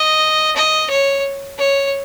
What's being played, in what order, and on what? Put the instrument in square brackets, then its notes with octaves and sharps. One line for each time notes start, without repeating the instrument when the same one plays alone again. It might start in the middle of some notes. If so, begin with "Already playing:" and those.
Already playing: [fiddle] D#5
D#5
C#5
C#5